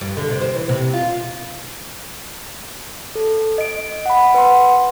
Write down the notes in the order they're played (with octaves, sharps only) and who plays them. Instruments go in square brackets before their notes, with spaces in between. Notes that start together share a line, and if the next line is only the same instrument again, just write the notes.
[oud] G2
D3
C3
C5
E3
C3
F4
[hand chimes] A4
D#5 D7
F#5 B5
B4 F#5 C6